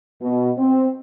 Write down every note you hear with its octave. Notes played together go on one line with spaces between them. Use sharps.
B2
C4